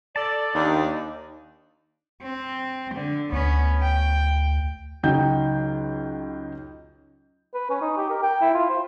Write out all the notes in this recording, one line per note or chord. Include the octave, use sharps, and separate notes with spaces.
A4 D5 A5
D#2 D4 D#4
C4
D3
D2 B3 C#4
G5
C#2 F#3 D#4 G5 G6
B4
C#4
D#4
G4
A#4
G5
E4
F4
C5